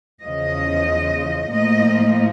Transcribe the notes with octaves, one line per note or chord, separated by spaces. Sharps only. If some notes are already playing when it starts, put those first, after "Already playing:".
E2 C#3 F3 D#5
A2 F3 A#3 D#5